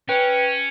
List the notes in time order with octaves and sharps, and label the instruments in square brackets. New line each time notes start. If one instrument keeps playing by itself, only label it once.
[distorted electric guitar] C#4 [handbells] B4 G5